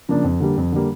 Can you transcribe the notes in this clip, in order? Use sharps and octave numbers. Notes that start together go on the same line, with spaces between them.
C#3 F3 A#3 D4
F2
D3 G3 A#3
F2
D3 G3 A#3